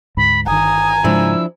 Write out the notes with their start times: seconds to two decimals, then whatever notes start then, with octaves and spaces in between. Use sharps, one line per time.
0.17 D2 G#2 B5
0.47 G1 D#3 G#5 A#5 D#6
1.04 G#2 C#3 F3 G#3 D4 E4 E6